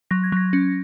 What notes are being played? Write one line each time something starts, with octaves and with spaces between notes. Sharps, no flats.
F#3 A#6
G#6
F#3 A#6
C#4